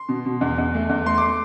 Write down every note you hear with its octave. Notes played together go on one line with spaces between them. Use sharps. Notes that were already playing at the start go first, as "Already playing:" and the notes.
Already playing: C6
B2
B2
E2
E2
A3
E2
A3 C6
D6
C6